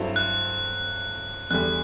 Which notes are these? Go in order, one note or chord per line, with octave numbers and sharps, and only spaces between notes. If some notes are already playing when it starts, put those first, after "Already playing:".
Already playing: G2 F#3 C4 E4 A4
F#6
E2 D3 G3 F#6